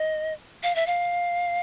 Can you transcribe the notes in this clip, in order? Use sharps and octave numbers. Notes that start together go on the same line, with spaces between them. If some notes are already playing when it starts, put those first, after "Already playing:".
Already playing: D#5
F5
E5
F5